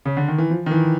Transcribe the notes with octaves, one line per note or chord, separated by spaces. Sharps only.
C#3
D3
D#3
E3
F3
D#3
E3